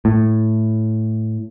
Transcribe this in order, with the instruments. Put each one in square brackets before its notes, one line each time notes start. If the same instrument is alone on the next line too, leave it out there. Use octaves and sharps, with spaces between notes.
[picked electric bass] A2